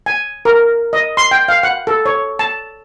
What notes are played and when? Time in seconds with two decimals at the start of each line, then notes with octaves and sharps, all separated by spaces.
0.06 G#5
0.45 A#4
0.93 D#5
1.17 C6
1.31 G5
1.48 F5
1.63 F#5
1.87 A4
2.06 C#5
2.39 A5